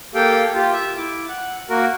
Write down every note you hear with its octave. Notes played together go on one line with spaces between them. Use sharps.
A#3 G4 A4 F5 G5
F4 G4
E5
E4 D6
F#5
A#3 F#4 A#4